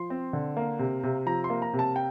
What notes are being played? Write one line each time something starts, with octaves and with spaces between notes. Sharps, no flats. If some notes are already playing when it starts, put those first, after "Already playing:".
Already playing: F3 C6
C4
D3
A#3
C3
C3
F3 A#5
C6
A#3
A#5
C3
A5
G5